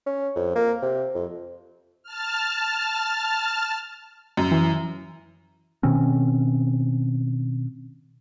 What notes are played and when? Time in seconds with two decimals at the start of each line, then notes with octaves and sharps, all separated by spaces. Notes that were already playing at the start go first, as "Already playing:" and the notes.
0.06 C#4
0.36 F2
0.55 A#3
0.82 C3
1.14 F2
2.03 A5 F6
4.37 F#2
4.51 E3
5.83 B2 D#3 C4 C#4